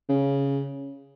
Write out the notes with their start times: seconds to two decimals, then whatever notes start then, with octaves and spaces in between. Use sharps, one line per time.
0.09 C#3